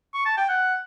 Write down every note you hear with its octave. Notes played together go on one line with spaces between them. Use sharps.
C#6
A5
G5
F#5